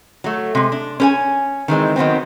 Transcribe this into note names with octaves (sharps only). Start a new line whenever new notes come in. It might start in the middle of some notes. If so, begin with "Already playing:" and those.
F#3 A3
C3 G#3
D4
C#4 B4 G#5
D#3 E3 G#3 C4
D#3 F#3 B3 C4